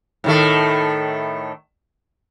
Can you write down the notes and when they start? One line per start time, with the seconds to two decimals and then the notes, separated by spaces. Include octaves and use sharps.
0.24 A2 D#3 A3